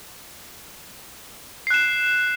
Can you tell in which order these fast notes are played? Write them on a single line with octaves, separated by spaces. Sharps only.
C7 F#6 E7